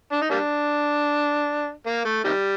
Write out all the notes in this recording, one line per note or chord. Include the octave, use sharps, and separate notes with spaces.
D4
D#4
G3 A#3 D4
A#3
A3
C3 D#3 G3